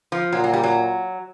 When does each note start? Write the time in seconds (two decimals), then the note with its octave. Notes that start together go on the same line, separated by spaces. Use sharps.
0.12 F3
0.32 A#2 F#3
0.44 F#3
0.54 G3
0.63 F#3